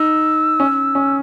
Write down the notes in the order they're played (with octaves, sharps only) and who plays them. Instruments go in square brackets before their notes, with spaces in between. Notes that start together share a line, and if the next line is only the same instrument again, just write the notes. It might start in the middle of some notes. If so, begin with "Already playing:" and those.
Already playing: [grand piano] D#4 [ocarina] E6
[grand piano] C#4
C#4